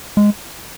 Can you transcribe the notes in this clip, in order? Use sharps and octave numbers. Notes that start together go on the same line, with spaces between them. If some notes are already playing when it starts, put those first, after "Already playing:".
G#3